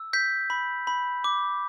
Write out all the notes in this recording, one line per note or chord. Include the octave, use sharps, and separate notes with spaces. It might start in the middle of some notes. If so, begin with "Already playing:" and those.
Already playing: E6
G6 B6
B5
B5
D6